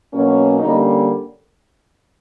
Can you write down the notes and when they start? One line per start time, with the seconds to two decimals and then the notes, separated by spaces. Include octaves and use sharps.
0.12 B2 F#3 A#3 C#4
0.60 D3 G3 A#3 C#4 D#4